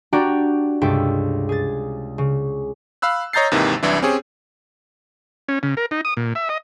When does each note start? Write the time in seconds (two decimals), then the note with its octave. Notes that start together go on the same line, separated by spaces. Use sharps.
0.13 D4 F#4 G4 D5 G5 A#5
0.82 C#2 G2 C3 A4 G5 B6
1.49 G#4 A6
2.18 C#3
3.02 F5 B5 E6 F#6
3.33 C#5 D#5 A#5 G6 A6 C7
3.52 D#2 G#2 C3 D#3 E3
3.83 C2 F#2 E3 D4 E4
4.02 C4 C#4 G4 G#4 C#5
5.48 C#4
5.63 C#3
5.77 A#4
5.91 D#4
6.05 D#6
6.17 A#2
6.35 E5
6.49 D#5